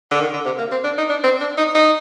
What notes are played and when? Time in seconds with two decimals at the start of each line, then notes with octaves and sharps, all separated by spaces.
0.11 D3
0.20 D#3
0.33 D3
0.45 C3
0.58 A#3
0.71 C4
0.84 D4
0.98 D#4
1.10 D4
1.24 C4
1.40 D4
1.58 D#4
1.75 D#4